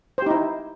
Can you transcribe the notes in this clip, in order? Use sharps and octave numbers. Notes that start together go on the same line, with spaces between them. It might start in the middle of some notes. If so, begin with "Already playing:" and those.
D#4 E4 G4 C5